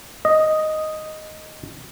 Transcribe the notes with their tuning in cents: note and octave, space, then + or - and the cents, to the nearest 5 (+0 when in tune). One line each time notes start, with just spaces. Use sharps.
D#5 +0